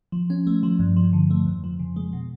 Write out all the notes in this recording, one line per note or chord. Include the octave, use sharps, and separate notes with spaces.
F3
C#4
A3
F3
G2
F3
D3
A3
F2
F3
C#3
G#3
B2